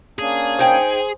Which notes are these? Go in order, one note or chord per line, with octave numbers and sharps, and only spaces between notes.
A#3 C#4 D4 G#4
D#4 C5 G5 G#5